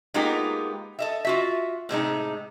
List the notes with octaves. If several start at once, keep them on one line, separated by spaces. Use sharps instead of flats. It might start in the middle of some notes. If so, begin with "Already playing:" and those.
G#3 A#3 B3 D#4 F4 G4
A4 D#5 E5
F4 F#4 E5
A2 C3 G#3 D#4